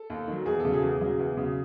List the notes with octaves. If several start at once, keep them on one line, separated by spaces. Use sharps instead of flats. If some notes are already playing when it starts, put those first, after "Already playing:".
Already playing: A4
D#2
D#3 F#3
E2 G#4
A4
C#3 F#3
G#4
E2
C#3 F#3
E2
C#3 F#3